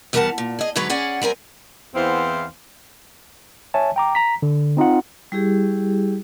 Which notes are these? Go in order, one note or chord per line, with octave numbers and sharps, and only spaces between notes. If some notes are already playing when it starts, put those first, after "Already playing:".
E2 G3 A#4 B4 F#5 A5
A#2
G#4 D#5
G#2 D3 F#3 G#4 B4 C#5
C#4 G#4 D5 F#5
G3 C4 A#4 G#5
E2 E3 B3 C4 C5 F5
C#5 E5 G#5 A5
G5 A#5 D6
A#5 B6
D3
C4 D#4 F4 F#5
G3 E4 G4 G#4